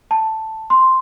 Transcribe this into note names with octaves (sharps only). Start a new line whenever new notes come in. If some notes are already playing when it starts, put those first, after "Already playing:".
A5
C6